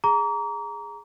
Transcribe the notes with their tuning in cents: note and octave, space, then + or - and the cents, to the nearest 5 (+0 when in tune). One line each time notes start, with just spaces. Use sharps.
G#4 +0 A#5 +0 D6 -40